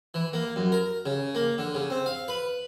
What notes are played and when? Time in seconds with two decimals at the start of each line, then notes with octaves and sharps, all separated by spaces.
0.14 E3
0.33 A#3
0.56 F#2
0.72 A#4
1.06 C#3
1.35 A#3
1.58 D3
1.75 C#3
1.90 C4
2.06 F5
2.28 B4